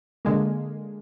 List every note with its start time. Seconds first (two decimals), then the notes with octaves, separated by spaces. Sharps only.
0.25 D3 G#3 A#3